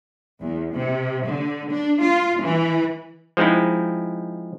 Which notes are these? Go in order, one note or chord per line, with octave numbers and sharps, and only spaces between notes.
E2
C3
D3
D4
F4
E3
F3 G#3 C4 D#4 E4